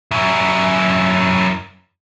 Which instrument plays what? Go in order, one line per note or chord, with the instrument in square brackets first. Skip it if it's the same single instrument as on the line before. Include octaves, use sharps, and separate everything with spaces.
[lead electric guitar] F#2 E4